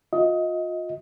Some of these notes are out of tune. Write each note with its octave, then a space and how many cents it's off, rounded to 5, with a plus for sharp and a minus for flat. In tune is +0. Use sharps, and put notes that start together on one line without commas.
F4 +35 D#5 +20